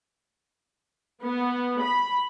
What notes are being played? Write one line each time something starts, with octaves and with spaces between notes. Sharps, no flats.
B3
B5